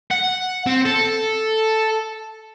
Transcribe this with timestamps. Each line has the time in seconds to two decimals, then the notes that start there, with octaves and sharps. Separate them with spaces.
0.11 F#5
0.66 C4
0.86 A4